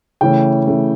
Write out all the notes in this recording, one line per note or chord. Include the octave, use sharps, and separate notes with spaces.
C#3 E3 A3 C#4 G5
C#3 E3 A3 C#4